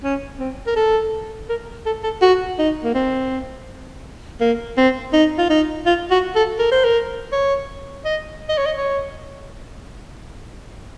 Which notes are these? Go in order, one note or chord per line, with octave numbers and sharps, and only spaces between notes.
C#4
C4
A#4
A4
A#4
A4
A4
F#4
D#4
A#3
C4
A#3
C4
D#4
F4
D#4
F4
F#4
A4
A#4
C5
A#4
C#5
D#5
D#5
C#5
D#5
C#5